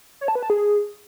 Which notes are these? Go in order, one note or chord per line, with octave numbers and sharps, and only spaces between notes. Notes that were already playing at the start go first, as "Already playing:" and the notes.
C#5
A5
B4
A5
G#4